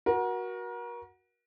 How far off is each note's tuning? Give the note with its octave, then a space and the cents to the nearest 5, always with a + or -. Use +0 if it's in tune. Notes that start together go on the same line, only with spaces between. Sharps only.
F#4 +0 A#4 +35